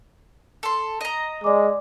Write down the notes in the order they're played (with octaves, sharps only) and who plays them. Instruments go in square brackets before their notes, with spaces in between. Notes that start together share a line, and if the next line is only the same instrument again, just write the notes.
[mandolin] A4 C6
D#5 A#5
[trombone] G#3 [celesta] D5 D6